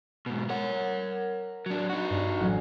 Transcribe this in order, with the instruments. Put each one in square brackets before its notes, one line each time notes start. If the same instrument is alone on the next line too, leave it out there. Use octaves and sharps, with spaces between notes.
[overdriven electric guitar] G#2 B2
[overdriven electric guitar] A#4 F#5 [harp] C#5 E7
[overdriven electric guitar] F#3 D4
D#4 F#4
[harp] G2
A1 F#3 C#4